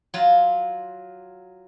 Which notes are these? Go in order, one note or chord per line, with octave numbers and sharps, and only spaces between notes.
F#3 F4